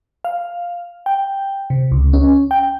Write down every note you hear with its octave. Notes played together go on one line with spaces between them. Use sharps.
F5
G5
C3
C#2
C#4
G5